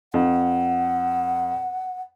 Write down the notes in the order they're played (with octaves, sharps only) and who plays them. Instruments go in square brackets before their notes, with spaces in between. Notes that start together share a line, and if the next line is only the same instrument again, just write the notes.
[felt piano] F2 [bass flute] F#5